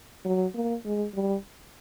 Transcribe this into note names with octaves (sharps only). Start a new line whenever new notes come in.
F#3
A#3
G#3
G3